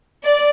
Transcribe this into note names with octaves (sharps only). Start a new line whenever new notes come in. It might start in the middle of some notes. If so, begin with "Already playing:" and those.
D5